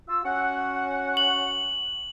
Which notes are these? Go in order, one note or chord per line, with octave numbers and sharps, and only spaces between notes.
F4 E6
C#4 F#4 F#5
F#7